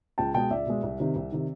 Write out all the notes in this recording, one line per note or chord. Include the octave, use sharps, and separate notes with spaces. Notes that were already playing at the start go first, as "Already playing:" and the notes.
C#2 G5 A5
B2 G#3 G5 A5
C#2 D5 E5
B2 G#3
C2
C3 D#3
C2
C3 D#3